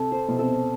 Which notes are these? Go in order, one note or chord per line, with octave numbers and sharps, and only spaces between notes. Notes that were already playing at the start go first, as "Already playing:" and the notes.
Already playing: C3 A4
C5
B2
C3 A4